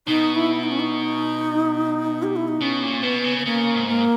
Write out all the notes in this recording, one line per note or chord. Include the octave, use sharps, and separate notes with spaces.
B2 D#4
E4
D#4
C#4
D#4
G4
E4
D#4
B2 C#4
A#2
B2 B3
C#3
B3
C#3 A#3
G#2
A#3